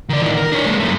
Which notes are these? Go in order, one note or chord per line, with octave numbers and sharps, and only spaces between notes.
D#3 D5
A2 D#3
A#4
D4 C#5
G#3 A#3
F#2 A3